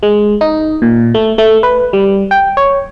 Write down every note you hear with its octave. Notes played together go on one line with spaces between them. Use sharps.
G#3
D#4
A#2
A3
A3
B4
G3
G5
C#5